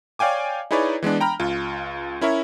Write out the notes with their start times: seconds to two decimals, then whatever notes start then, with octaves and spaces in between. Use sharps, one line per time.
0.19 C#5 D5 F5 G5 G#5 D6
0.71 D#4 E4 G#4 B4 C#5 D5
1.03 E3 G#3 B3 D4
1.20 G5 A#5 B5 F6
1.40 C#2 F4
2.21 C#4 E4 A#4 C#5 E5